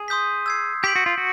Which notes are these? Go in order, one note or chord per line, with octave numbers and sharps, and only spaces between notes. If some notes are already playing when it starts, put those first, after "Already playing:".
Already playing: G#4
C6 D#6 G6 B6
E6 G#6 C7
G4 G6 B6 D7 F#7
F#4
F4
F#4